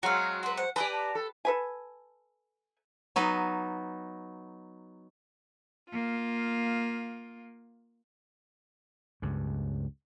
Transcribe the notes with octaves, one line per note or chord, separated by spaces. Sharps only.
F#3 G#3 C4 F#4 F5 A#5
F#4 B4 C6
C5 F#5
G4 B4 D5 D#5 G#5 A#5
A5
A4
A4 B4 G#5
F#3 B3 D#4
A#3 F4
C#2 G2